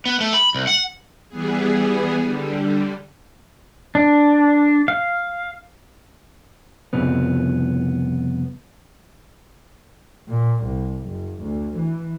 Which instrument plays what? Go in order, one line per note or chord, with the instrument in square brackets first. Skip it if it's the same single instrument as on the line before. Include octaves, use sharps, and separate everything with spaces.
[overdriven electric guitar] B3
A3
B5
C2
F#5
[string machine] E3 G3 B3 G#4
D3 G3
[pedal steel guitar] D4
F5
[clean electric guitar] C2 F2 C#3 B3
[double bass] A#2
C2
F#1
D2
E3